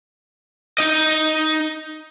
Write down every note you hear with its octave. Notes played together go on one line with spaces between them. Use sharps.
D#4 D#5